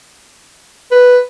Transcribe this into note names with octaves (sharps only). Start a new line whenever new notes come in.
B4